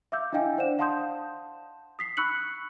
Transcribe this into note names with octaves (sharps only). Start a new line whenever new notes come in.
E5 F5 D6 E6 G6
D4 E4 D#5 F5 G5 G#5
D4 C5 D5 F#5 E7
F5 F#5 A5 C6 D#6 G6
D#6 B6 C7
B5 C#6 E6 F#6 C#7 F#7